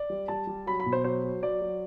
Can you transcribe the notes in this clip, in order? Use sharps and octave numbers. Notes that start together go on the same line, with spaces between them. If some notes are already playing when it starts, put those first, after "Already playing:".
Already playing: D5
G3
G3 A5
G3
F#3 B5
B5
B2
C5
F#3 C5
F#3
F#3 D5
F#3